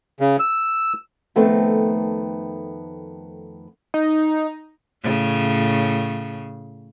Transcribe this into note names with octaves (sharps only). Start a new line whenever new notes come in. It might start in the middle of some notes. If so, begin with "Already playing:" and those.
C#3
E6
F2 D#3 A3 B3 C4
D#4
A2 C#3